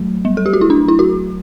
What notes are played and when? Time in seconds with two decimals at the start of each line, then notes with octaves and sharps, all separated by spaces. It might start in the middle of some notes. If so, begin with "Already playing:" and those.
Already playing: F#3 A3
0.25 G3
0.37 A4
0.46 G4
0.53 F#4
0.61 E4
0.70 D4
0.88 E4
0.99 F#4